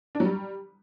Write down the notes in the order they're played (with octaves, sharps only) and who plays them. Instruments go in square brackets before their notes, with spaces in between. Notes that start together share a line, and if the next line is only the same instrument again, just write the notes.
[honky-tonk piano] D4
F#3
G3